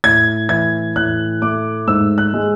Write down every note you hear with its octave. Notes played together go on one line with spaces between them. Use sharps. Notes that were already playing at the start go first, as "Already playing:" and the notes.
A2 G#6
E3 G#6
A2 F#6
A3 D6
G#2 E6
F#6
G#3